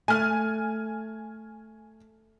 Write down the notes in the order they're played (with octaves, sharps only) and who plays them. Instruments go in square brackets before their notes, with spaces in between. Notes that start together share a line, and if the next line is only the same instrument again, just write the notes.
[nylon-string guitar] A3 [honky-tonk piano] G#5 F6